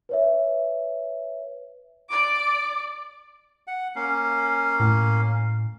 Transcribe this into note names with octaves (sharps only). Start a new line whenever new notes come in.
B4 C#5 E5
D5 D6
F#5
A#3 C#4 F5
A2